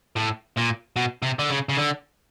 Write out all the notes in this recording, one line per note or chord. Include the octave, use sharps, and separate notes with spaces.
A2
A#2
B2
C3
D3
C#3
C#3
D3